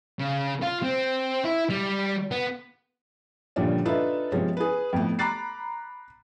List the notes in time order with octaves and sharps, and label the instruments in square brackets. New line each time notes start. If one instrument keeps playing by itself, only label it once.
[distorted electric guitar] C#3
F4
C4
E4
G3
B3
[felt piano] A#2 D3 D#3 F3 G3 C#4
D4 D#4 F4 A4 B4 E5
C3 F3 G#3 B3 C#4
G#4 B4
F2 A2 A3 B3
A#5 B5 D6 F#6 A6 C7